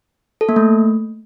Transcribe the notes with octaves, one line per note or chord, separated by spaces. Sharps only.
A4
A#3
A3